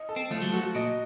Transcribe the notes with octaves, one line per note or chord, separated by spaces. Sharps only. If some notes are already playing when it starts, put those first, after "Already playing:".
Already playing: D#5
A4
C4
F3 A3
F#3
A3 F#4
A#2 D#5